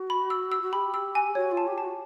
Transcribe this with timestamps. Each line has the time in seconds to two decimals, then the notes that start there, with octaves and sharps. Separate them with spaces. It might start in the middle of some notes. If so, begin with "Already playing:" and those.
Already playing: F#4
0.10 B5
0.30 E6
0.52 E6
0.62 F#4
0.73 G4 B5
0.94 E6
1.15 G#5
1.35 F#4 C#5
1.52 F4
1.57 A5
1.67 G4
1.78 A5
1.83 F#4